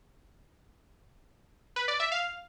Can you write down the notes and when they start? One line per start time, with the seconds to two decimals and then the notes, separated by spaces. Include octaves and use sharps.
1.76 B4
1.88 D5
2.00 E5
2.12 F5